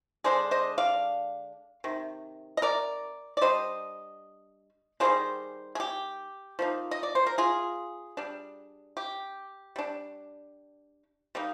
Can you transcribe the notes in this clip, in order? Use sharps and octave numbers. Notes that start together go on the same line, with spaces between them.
D3 G#3 D4 G#4 C5
C5 D#5
D5 F5
C3 D#3
D#5
A#4 D5
D5
G3 D4 C5 D#5
D#3 G3 A#3 D4 G#4 C5
G#4
G4
F3 A#3 D#4
D#5
D5
C5
A#4
F4 G#4
G3 D4
G4
G3 D4
G3 A#3 D#4